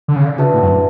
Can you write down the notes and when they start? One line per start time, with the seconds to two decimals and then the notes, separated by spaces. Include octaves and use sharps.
0.08 D3
0.16 C#3
0.26 D3
0.38 C#3 D4 F#4 B4 E5 A5
0.54 A2
0.63 F#2